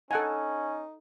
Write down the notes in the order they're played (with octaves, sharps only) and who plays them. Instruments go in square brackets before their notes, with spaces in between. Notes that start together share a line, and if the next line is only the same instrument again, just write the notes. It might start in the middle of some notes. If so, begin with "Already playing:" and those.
[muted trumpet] C#4 [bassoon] D#4 [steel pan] A4 F#5 G#5